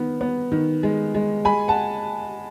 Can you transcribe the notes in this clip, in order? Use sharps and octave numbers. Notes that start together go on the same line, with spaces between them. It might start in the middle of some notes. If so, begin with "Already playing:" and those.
Already playing: D#3 B3
B3
D#3
G#3
G#3
G#3 G#5 B5
F#5 A5